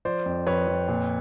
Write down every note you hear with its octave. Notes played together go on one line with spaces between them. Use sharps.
F3 C5 D5
F2
F2 B4 C#5
F2
A#2